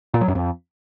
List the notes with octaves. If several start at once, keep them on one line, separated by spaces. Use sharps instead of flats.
A#2
F#3
F#2
F2